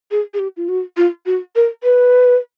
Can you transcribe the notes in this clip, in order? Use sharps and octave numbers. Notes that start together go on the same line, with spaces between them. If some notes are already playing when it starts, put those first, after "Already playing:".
G#4
G#4
G4
F4
F#4
F4
F#4
A#4
B4